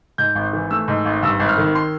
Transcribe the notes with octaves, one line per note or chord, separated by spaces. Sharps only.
G#2 G6
G#1
E3
A3 E6
G#2
G#1
G2 E6
G#1
F6
D#3
C6